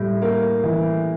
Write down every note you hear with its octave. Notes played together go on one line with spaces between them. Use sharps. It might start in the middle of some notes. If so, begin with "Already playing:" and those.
Already playing: A2 G3
A#3
E3